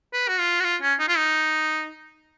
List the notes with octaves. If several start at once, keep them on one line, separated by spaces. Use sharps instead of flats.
B4
F#4
F4
F#4
F4
C#4
D#4
F4
D#4